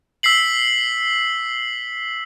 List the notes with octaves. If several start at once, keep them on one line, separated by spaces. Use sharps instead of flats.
E6 B6 C7 F#7